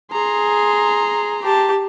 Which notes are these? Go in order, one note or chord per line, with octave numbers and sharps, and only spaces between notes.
G#4 A#5 C6
G4 A5